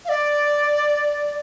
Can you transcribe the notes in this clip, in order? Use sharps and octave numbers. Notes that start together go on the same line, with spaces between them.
F5
D5